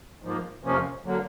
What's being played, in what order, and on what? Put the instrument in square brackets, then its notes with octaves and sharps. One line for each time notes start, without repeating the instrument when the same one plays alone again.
[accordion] G#2 F3 A#3
F2 C3 F3 A#3 C#4
D3 F#3 A#3